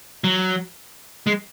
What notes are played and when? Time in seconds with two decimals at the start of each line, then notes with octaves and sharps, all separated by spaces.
0.24 F#3
1.27 G#3